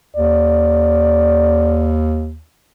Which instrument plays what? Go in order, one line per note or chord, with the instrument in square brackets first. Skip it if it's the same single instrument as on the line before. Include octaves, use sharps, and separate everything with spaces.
[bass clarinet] D#2 [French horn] D5